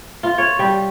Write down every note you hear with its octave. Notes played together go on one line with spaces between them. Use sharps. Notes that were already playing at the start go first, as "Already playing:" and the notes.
F4
C#5
G3